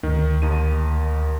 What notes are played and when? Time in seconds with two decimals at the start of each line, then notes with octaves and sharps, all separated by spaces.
0.03 D2 D#3
0.42 D#2 D#3 D#7